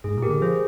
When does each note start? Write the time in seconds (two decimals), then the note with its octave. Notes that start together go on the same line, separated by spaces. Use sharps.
0.04 G#2 G#4
0.17 A#2
0.22 G4 A#4
0.29 D3
0.41 F3 G#4 C5